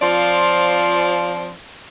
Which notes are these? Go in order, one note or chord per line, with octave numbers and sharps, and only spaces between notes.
F3 C4 F4 C5 D5